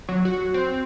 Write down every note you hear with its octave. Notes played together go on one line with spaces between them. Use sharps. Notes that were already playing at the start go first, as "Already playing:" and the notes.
F#3
F#4
C4